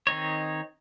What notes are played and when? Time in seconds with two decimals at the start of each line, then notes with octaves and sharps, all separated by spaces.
0.07 D#3 C4 D#4 C#5